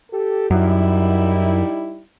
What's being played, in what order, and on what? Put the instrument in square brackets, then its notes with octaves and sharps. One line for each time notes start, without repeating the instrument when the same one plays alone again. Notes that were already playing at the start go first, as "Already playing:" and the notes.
[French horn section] G4 A4
[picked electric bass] F#2 [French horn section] G3 D#4 E4